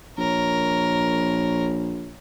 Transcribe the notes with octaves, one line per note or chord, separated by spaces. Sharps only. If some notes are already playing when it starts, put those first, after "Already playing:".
A#1 A#4 C#5